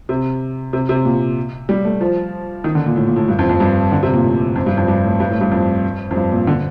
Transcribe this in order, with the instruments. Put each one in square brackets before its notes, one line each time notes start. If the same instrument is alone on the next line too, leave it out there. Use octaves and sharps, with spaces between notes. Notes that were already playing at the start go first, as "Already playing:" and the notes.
[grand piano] C3
C3
C3
A#2
G3
A3
F3
D#3
D3
A#2
A2
A#2
A2
G2
F2
F2
G2
D3
C3
A#2
A2
F2
G2
F2
G2
A2
G2
A2
G2
F2
F2
G2
A#2
D3